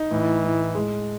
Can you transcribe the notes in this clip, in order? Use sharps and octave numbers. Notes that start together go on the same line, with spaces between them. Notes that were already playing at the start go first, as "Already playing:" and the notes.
Already playing: D#4
A2 E3
A2
G#3